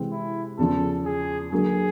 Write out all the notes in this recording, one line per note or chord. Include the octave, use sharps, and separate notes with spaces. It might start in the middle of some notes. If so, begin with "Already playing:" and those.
Already playing: C3 E3 G#3 C4
E4
E2 C#3 F3 A4
G#4
D3 F#3 A#3 G#4